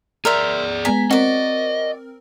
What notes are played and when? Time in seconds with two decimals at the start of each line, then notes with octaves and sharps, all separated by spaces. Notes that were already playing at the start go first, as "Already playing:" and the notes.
0.25 G#4 A#4 C5 D5 E5
0.85 G#3 B3 G#5 A#5 B6
1.11 C4 F#4 A#4 D5 D#5